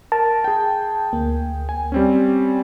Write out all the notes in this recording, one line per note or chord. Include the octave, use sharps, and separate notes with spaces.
A#4 A5
G#4 G5
D2 A#3
G#5
G3 C4 C#4